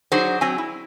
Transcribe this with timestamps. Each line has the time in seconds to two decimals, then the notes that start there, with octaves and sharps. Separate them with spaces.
0.12 F#3 D4 D#4 F#4 G#4 C5
0.41 F#3 C4 G#5
0.58 E4